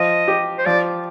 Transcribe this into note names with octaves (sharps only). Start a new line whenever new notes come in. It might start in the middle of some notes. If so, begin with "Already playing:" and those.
Already playing: F3 D#5
G4
C5
F3 D5